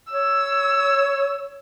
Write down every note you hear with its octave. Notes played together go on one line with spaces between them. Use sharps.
C#5 E6